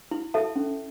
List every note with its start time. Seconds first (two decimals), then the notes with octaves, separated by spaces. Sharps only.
0.11 E4
0.34 A4 E5 A5
0.56 C#4